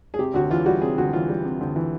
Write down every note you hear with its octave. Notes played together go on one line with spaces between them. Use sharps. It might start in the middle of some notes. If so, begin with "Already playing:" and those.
G#4
C3 G4
D2 F#4
E3 F4
G3 F#4
C3 G#4
D2 F#4
E3 F4
G3
C3
D2
E3